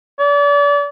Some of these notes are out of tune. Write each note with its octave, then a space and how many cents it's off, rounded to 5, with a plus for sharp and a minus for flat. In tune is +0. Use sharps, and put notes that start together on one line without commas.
D5 -35